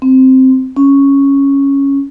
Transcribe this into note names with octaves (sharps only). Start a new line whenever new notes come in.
C4
C#4